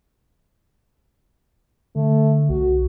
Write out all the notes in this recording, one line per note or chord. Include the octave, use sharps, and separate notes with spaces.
D3 A3
C2 F#4